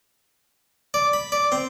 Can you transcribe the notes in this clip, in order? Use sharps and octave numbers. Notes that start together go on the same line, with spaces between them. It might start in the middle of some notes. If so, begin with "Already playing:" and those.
D5
B5
D5
C4